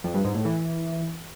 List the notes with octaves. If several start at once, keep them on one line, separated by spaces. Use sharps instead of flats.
F2
G2
G#2
A2
E3